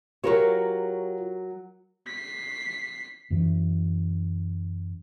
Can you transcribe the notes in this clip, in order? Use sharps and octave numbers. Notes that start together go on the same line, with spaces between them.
F#3 F4 G4 A#4 C#5
B6 C7
F#2 E3